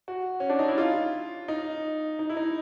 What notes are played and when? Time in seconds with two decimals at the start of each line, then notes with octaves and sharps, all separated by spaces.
0.08 F#4
0.40 C#4
0.50 D4
0.59 D#4
0.68 E4
0.78 F4
1.48 D#4
2.19 D#4
2.30 E4
2.37 D#4